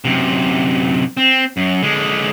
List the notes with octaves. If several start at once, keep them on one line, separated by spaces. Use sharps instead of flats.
F#2 C3
C4
F#2
D3 G#3